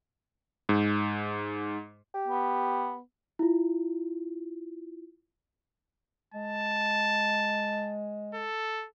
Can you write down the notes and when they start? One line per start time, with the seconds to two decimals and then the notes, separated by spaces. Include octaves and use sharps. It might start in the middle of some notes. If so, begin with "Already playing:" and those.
0.69 G#2
2.14 G4
2.28 B3
3.39 E4 F4
6.34 G#3 A5
8.34 A4